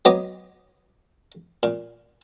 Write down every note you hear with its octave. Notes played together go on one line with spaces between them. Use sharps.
F#3 B3 D#5 D6
A#2